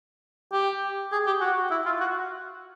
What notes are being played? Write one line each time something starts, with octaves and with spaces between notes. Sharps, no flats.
G4
G#4
G4
F#4
E4
F4
F#4